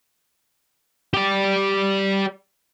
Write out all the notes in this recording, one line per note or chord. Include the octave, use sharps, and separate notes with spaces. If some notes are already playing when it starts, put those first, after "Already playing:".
G4 D5